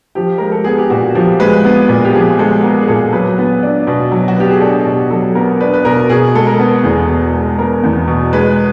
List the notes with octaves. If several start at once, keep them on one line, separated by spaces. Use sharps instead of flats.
F3 G4
G#3 A#4
A4
B3 G#4
G4
A#2 F#4
F3 G4
G#3 B4
B3
A#2
G4
F3 G#4
G#3 A4
B3 A#4
G#4
A#2 A4
F#3 B4
B3
D4
B2
F#3
F#4
B3 G4
G#4
D4 A4
B2 G4
F#3 A4
B3 A#4
D4 B4
B4
B2 A#4
B2 G#4
G#3 A4
A#4
B3
E2 G#4
B2
G#3
B3 A#4
E2
B2
G#3 B4